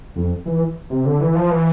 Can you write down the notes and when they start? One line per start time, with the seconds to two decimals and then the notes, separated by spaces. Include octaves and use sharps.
0.16 F2
0.46 E3
0.90 C3
1.05 D3
1.20 E3
1.35 F3
1.50 E3